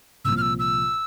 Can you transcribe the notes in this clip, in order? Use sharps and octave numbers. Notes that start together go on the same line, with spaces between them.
C2 A#2 F3 E6
F6
E6
E6